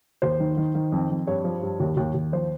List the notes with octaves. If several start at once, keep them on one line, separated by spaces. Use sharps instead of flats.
D#2 C5
D#3
D#3
D#3
F2
F2
G2 C#5
F3
G2
D#2
D#2
D#2
F3 C5